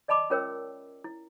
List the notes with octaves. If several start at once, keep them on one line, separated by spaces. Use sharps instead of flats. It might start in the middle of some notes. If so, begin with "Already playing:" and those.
D5 D#5 A5 B5 D6
C#4 F4 A#4 C#5 G5 E6
E4